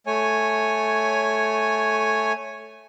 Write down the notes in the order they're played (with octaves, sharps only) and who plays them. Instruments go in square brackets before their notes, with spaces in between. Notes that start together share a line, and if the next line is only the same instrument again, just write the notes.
[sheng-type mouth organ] A3 C#5 G#5